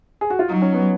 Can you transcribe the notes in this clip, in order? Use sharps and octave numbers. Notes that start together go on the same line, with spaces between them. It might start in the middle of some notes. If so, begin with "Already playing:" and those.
G#4
F#4
F4
F#3 D#4
C#4
B3